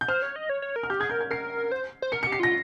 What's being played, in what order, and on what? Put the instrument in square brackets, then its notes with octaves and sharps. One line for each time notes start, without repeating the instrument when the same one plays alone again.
[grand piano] G6
[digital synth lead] C5 [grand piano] F6
[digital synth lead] C#5
D#5
C#5
C#5
A#4
[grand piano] F6
[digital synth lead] G4 [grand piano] G6
[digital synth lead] G#4 [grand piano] G#6
[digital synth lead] A#4 [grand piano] G6
[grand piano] G#6
[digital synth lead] A#4 [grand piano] C7
[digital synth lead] C5
C5
[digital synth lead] A#4 [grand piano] C#7
[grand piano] C#7
[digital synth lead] G4
[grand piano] C7
[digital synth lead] F4 [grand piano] A#6